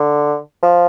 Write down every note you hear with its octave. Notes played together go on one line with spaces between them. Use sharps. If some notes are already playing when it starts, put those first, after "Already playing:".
Already playing: D3
F3